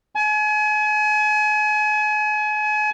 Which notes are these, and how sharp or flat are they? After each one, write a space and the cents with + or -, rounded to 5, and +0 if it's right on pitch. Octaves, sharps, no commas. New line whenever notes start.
G#5 +35